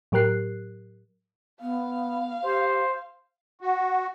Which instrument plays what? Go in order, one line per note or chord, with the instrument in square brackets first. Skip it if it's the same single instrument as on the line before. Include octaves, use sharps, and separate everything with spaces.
[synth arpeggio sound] A2 F#3 G4 A#4 F#6 C7
[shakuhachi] B3 [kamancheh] F5
[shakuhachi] G4 [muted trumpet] C5
[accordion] F#4